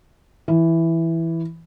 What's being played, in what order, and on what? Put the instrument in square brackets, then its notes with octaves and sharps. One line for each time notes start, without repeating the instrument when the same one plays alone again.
[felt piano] E3